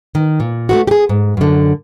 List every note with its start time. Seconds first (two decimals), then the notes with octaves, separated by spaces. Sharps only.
0.15 D#3
0.40 A#2
0.69 A3 A#3 F#4
0.87 G4 G#4
1.09 G#2
1.37 F#2 D3